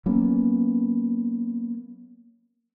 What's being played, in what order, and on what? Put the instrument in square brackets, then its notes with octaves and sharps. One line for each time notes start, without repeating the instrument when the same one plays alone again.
[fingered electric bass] F#3 A#3 B3 C#4